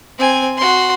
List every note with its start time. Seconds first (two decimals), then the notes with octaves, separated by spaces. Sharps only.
0.19 C4 G#5
0.57 F#4 C6